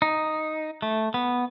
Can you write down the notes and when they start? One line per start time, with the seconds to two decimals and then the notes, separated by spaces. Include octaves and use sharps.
0.02 D#4
0.82 A3
1.14 B3